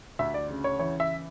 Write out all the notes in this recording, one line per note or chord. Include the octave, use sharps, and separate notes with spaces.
D2 E5
D5
C#3
C#5
E3 C#5
E5